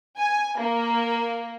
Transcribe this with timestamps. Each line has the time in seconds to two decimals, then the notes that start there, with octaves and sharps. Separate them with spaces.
0.18 G#5
0.59 A#3